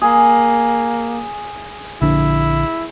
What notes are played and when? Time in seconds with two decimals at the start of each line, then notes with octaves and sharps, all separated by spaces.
0.01 A#3 G#4
2.01 A#1 D3 D4 E4